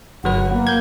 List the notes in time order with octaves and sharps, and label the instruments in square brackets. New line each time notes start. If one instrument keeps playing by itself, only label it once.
[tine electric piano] G1 F#3 B4 [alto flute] F#5
[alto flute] A#3
[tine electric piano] G6 G#6